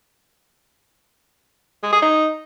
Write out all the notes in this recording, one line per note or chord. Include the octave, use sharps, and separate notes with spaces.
G#3
G#4
D#4